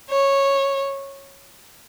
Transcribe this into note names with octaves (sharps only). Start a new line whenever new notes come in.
C#5